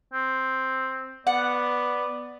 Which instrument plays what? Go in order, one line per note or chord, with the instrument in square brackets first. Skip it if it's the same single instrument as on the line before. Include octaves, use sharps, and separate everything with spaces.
[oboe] C4
[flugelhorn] B3 [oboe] D5 [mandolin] F#5